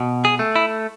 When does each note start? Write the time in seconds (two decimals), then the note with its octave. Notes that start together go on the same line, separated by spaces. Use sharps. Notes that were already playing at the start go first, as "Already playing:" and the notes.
Already playing: B2
0.25 G#4
0.39 A3
0.56 E4